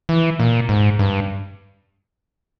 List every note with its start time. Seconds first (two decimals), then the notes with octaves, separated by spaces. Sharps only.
0.09 E3
0.39 A#2
0.69 G#2
0.99 G2